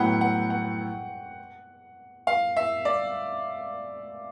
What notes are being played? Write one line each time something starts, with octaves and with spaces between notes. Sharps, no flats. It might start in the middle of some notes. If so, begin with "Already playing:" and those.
Already playing: A2 F#3 B3 E4 F#5 G5
F#5
F#5
F5
E5
D5